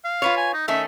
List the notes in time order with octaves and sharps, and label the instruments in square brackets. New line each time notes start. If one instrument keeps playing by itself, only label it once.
[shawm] F5
[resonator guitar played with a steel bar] F4 B4 C#5
[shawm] G#5
D#4
[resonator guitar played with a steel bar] D#3 A3 C#4 [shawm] E5